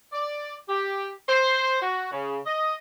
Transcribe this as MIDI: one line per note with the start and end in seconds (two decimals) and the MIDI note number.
0.13 0.53 74
0.69 1.10 67
1.28 1.79 72
1.81 2.09 66
2.12 2.39 49
2.46 2.74 75